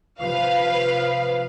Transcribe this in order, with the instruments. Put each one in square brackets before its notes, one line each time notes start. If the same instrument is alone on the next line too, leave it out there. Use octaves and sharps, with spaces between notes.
[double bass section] C3 F3 [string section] B4 F5